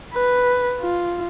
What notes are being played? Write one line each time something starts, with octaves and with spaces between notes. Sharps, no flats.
B4
F4